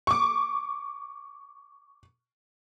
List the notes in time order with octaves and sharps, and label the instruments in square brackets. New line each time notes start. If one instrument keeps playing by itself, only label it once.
[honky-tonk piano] C#6 D6